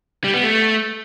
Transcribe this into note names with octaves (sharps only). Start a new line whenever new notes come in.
G3
B3
A3